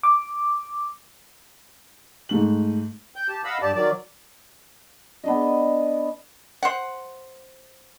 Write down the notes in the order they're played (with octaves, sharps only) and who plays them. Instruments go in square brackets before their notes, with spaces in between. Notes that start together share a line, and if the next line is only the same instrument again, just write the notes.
[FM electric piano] D6
[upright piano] G#2 A3 F#7
[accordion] G5 G6
G4 A5
D#5 F5 F#5 B5 E6
G2 G4 D5 A5
D#3 F#3 D5
[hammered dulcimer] B3 D4 D#5
[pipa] C5 F#5